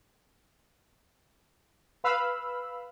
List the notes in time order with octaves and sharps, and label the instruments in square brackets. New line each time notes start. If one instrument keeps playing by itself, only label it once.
[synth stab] B4 F5 B5 E6